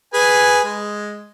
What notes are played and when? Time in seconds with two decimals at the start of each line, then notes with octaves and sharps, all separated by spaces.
0.14 G#4 B4 G#5
0.64 G#3